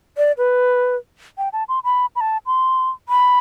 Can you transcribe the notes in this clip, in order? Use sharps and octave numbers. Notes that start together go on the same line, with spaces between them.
D5
B4
G5
A5
C6
B5
B5
A5
C6
B5